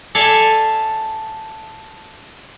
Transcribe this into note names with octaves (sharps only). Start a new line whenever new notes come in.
A4 D5 E5 F5 G#5